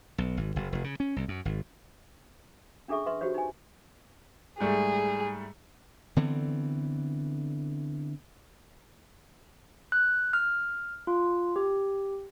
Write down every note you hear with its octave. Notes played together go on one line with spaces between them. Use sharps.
B1
G#1
F#1
F1
C#3
C#4
C2
F#2
G#1
C#4 D4 G#4 A4 E5 C#6
B4 E5 C6
F#4 G4 C5 C#5
D#4 G#5
G#2 G3 A3 G#4
D3 E3 B3 C4
F#6
F6
F4
G4